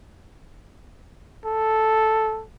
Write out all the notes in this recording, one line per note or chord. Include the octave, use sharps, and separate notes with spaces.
A4